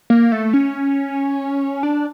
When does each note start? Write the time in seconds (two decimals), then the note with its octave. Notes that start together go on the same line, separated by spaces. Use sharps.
0.10 A#3
0.32 A3
0.54 C#4
1.83 D4